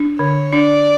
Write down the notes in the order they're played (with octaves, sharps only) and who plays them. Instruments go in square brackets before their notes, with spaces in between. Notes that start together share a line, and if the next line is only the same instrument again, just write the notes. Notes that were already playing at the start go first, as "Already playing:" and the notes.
Already playing: [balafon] D4
[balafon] D3 [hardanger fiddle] C#5
[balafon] D4 [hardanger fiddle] D5